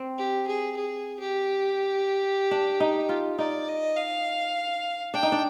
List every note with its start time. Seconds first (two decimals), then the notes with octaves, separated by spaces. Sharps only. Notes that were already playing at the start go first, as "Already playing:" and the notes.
Already playing: C4
0.18 G4
0.47 G#4
0.77 G#4
1.20 G4
2.51 D4
2.80 D#4
3.09 F4
3.38 D#4 D5
3.68 D#5
3.97 F5
5.14 D4 G5
5.23 D#4
5.32 D4